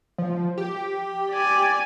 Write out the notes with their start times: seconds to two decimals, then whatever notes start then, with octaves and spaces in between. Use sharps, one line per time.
0.18 F3
0.58 G4
1.30 D5 G#5